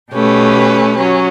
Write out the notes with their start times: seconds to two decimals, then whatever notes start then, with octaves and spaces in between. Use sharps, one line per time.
0.11 B2 A3 C#4 G4 B4
0.98 F#3 C#4